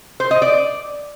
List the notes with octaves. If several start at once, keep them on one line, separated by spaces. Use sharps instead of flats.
C5
D#5
D5